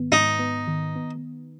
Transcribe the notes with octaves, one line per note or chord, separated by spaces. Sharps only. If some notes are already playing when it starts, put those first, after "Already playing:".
Already playing: G#2 D#3 B3
G#2 D#4
B3
D#3
B3